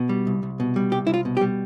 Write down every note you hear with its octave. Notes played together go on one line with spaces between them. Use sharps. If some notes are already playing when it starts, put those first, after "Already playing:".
Already playing: B2
G3
C2
C2
B2
G3
C2 G4
C2 E4
F4
B2
G4
G3